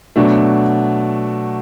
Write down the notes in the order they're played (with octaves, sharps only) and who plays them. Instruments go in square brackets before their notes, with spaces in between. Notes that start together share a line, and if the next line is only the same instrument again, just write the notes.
[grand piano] B2 F#3 A3 D4